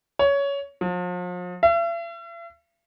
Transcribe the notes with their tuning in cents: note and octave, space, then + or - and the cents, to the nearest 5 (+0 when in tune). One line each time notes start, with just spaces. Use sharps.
C#5 +15
F3 +40
E5 +45